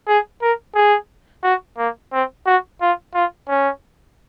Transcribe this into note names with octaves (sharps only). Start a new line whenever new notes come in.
G#4
A#4
G#4
F#4
A#3
C4
F#4
F4
F4
C#4